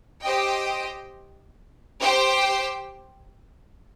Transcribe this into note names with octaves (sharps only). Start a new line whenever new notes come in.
G4 C5 D#5 G5
G4 C5 G5